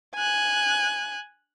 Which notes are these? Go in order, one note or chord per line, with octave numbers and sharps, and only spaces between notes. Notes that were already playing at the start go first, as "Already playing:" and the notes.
G#5 F#6